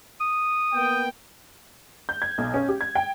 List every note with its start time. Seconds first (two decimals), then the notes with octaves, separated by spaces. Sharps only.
0.21 D#6
0.73 A#3 B3 G5
2.09 G6
2.22 G#6
2.38 B1
2.54 C#4
2.69 G4
2.81 G#6
2.95 G5